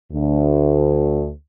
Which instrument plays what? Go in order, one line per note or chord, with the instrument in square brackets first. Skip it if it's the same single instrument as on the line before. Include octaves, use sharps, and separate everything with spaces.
[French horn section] D2